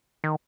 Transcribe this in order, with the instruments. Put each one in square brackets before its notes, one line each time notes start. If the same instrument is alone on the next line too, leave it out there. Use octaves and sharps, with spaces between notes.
[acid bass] D#3